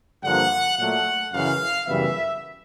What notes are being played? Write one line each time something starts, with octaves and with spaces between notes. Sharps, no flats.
G2 D3 F3 A#3 F#5
A#2 F#3 A3 F#5
F#2 C#3 E3 F5
F#2 C#3 E3 G3 B3 E5